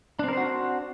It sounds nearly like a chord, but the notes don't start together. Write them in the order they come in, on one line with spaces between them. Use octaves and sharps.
D4 C4 A#4 C5 F#4